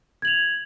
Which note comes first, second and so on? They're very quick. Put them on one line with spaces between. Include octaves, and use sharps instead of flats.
G#6 F#7 F7